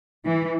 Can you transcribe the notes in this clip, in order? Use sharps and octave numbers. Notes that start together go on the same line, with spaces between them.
E3